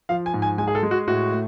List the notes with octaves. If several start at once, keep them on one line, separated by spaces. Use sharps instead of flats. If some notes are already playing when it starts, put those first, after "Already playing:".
F3 F5
G#5
G#2
G#5
G#3 G#5
G#4
A4
G#3
F#4
A2 F#4
A3